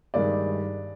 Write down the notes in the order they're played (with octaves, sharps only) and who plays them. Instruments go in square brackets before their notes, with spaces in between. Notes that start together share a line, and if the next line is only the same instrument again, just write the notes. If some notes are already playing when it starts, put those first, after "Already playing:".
[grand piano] G2 D#3 G#3 D5